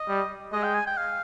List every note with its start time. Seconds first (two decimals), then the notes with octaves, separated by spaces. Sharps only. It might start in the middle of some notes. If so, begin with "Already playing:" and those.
Already playing: D#5
0.08 G3
0.53 G#3 D#5
0.64 G5
0.75 G#5
0.87 G5
0.97 F5